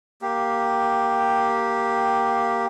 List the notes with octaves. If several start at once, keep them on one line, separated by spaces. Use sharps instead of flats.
A#3 G4